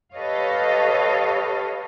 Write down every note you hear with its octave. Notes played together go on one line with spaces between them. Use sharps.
G4 A4 B4 C#5 D#5 F5